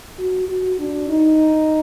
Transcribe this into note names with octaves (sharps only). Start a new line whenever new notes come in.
F#4
F#4
D4
D#4